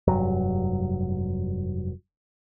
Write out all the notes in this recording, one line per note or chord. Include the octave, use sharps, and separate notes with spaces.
F1 G2 F#3